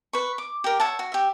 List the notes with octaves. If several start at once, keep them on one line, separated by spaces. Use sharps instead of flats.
B4 C#6
D6
G4 A#4
C#5 E5 F#5 A5
F#4
G4 E5